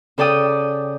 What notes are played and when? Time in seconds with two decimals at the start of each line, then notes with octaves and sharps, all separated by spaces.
0.18 C#3 A4 D5 G5 D#6